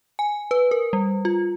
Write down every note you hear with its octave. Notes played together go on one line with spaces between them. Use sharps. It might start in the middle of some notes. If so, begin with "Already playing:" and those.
G#5
B4
A#4
G3
F4